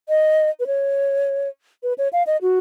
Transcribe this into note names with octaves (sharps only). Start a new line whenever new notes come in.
D#5
B4
C#5
B4
C#5
F5
D#5
F#4